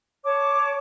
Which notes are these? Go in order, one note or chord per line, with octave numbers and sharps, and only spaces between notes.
C#5 A5 D6